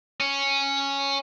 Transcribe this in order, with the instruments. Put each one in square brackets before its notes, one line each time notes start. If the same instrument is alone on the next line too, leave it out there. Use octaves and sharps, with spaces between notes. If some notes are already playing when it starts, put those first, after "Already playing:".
[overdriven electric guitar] C#4